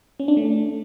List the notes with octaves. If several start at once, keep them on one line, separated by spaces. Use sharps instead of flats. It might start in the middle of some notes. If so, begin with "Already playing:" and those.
C#4
D4
A3